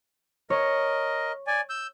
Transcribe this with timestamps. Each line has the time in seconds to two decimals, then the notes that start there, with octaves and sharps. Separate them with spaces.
0.50 A#4 C#5 D#5
1.47 D5 G#5
1.70 E6 G6